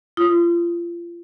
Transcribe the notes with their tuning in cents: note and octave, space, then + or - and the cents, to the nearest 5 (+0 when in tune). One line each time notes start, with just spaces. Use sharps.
F4 -30 D#6 +0